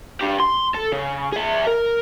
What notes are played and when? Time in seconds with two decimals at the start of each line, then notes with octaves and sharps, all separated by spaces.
0.21 D4 G4
0.40 C6
0.75 A4
0.93 C#3
1.32 G#4 E5
1.66 A#4